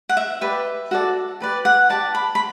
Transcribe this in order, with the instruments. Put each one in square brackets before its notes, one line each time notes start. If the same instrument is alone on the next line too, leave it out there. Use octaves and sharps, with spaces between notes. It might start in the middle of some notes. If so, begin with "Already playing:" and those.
[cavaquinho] F#5
E5
G4 B4 D5
F#4 A4 D5
G4 B4 D5
F#5
G4 D5 A5
B5
B5